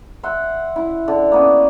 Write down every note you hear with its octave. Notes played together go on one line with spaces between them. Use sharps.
E5 F#5 C6
E4
D3
A#3 B3 C#4